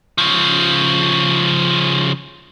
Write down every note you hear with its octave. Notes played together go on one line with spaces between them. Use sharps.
C#3 F3